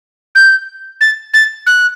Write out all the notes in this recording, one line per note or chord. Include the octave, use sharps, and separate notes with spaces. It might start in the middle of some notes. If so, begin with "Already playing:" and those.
G6
A6
A6
F#6